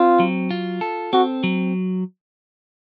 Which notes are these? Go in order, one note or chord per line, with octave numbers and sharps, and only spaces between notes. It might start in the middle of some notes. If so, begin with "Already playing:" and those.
Already playing: C4 F4
F#3
F4
A4
C4 F#4
F#3